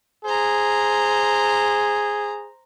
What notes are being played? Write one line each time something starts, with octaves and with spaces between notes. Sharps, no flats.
G#4 C5 A#5